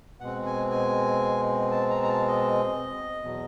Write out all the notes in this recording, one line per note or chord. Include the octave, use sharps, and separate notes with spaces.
B2 G#3 C4 F#5
G#5
G#5
A5
A#5
A#5
A5
D#5
E2 B2 F#3